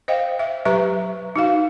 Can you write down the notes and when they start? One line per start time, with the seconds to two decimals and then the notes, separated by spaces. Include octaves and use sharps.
0.08 C5 D#5 F5 G5
0.39 E5
0.65 F#3 G4 B4 E5 A#5 C#6
1.36 D#4 F#4 F5